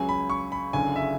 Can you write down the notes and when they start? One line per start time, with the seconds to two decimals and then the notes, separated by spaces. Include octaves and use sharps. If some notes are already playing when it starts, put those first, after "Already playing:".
Already playing: C#2 C#3 F#3 G#5
0.09 B5
0.30 C#6
0.52 B5
0.73 F#1 F#2 D3 G#5
0.96 E5